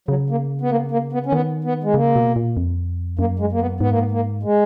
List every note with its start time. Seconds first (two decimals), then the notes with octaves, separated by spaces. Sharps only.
0.08 C#3 F#3
0.30 A#3
0.61 B3
0.70 A#3
0.91 A#3
1.13 B3
1.26 C#4
1.32 D#3 B3
1.64 B3
1.84 G#3
1.94 C#3 A#3
2.16 B2
2.36 A#2
2.57 F2
3.19 F#2 A#3
3.39 G#3
3.52 A#3
3.60 B3
3.80 G#2 B3
3.90 A#3
3.99 B3
4.12 A#3
4.43 G#3